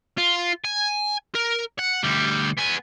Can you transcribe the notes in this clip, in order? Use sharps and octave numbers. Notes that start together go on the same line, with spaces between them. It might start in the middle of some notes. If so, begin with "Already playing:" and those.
F4
G#5
A#4
F#5
D2 G3
B3 G#5